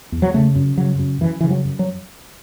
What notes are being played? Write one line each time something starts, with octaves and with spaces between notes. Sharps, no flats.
E2
F#3
C#3 A3
F#2
C#3 F#3
F#2
F#2 E3
C#3 E3
F#3
F#2
F#3